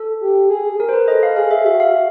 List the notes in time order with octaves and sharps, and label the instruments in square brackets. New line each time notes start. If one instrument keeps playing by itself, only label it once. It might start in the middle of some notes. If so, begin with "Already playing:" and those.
Already playing: [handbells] A4
[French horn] G4
G#4
[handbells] A#4
C5
B4
[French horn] A4 [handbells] D#5
[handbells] F5
[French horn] G#4 [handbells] F5
[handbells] E5
[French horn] F#4 [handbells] E5
[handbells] F5